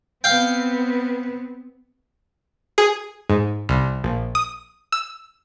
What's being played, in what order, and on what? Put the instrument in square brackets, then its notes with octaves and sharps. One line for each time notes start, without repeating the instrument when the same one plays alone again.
[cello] B3 C4 [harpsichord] F5 G5
[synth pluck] G#4
G#2
C2
A#1
D#6
E6